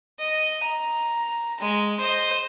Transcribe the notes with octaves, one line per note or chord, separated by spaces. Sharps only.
D#5
A#5
G#3
C5 D#5